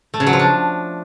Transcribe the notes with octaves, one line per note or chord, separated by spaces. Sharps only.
A3
C#3
F#3
F3
D4